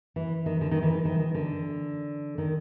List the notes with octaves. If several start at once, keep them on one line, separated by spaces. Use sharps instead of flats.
E3
D#3
D3
D#3
E3
D#3
D#3
D3
D#3